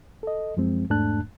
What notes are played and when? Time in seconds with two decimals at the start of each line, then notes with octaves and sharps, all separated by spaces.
0.23 A4 D#5
0.57 F#2 F3 G#3 C4
0.90 E2 G#2 A3 D4 A5 F#6